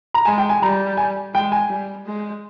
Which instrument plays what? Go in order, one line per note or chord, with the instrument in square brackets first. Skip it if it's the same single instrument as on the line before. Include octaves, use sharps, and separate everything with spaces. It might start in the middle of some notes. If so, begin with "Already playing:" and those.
[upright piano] A#5
[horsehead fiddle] G#3 [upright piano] G#5
[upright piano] G5
G#5
[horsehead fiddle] G3 [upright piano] A#5
[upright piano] G#5
[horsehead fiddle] G#3 [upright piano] G5
[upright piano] G#5
[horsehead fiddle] G3
G#3